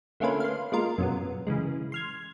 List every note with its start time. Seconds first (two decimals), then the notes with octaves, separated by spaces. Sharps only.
0.20 D3 A3 A#3 C#4 F4 B4
0.40 F5 C6
0.72 G#3 A#3 F4 A#4
0.98 F#2 B2 B3
1.47 C#3 E3 G#3
1.92 C6 F6 G#6